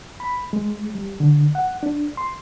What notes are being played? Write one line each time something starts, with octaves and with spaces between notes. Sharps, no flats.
B5
G#3
G3
D3
F#5
D4
C6